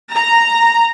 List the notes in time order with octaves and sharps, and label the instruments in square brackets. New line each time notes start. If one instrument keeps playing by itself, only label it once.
[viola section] A#5